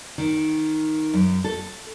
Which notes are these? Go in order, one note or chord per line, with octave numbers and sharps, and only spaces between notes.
D#3
F#2
A4